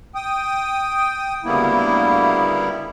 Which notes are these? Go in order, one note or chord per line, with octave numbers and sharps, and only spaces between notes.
G5 D#6
D2 C#3 G3 A#3 B3 E4